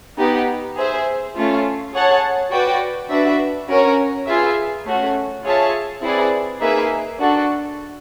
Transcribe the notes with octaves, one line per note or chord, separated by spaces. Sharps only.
B3 D#4 G4
G#4 C5 E5
A3 C#4 F4
G#4 C#5 F#5 A5
F#4 B4 D5 G5
D4 F#4 B4 E5
C#4 F#4 A#4 C#5
F4 G#4 B4 E5
A3 C#4 F#4
F4 G#4 C#5 E5 A5
C4 E4 G#4 B4 D5
A#3 D#4 G#4 B4 E5
D4 F#4 A4